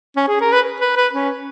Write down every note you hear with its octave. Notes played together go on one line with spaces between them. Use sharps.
C#4
G#4
A#4
B4
B4
B4
C#4